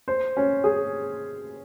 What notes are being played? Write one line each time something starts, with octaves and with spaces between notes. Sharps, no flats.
C5
C#4
G#4